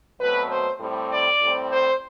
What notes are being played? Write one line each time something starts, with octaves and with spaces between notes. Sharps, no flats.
B2 F#3 A3 C4 B4
C5
A2 G3 C4
D5
A2 G3 C4
C5